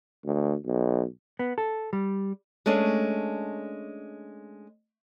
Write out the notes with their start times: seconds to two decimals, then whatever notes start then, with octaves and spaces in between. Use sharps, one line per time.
0.25 D2
0.66 B1
1.39 B3
1.58 A4
1.93 G3
2.66 G#3 A3 C#4 D4